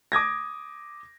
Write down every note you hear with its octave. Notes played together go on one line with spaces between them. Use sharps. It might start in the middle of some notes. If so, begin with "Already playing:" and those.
D6 D#6 G#6 A#6